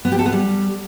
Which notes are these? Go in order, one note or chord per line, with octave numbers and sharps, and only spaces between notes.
B3
G4
A4
B3
G3